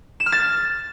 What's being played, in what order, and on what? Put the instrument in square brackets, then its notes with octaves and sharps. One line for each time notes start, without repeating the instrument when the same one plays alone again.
[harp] E7
F6
A6